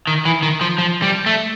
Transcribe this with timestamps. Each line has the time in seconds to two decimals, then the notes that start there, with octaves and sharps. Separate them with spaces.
0.07 D#3
0.25 E3
0.43 D#3
0.61 F3
0.78 F3
1.02 G3
1.26 A3